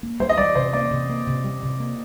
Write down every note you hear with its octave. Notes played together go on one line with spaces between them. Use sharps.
A#3
G3 C5
D#5
G3 D5
C3 C5
A#3 D5
C3
A#3
C3
G3
C3
A#3